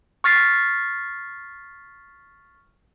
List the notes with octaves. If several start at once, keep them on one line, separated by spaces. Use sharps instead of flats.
C#6 F6 A6 B6 C7